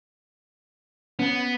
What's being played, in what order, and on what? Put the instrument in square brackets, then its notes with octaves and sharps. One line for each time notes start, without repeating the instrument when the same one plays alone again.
[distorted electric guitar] B3 [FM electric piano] C#4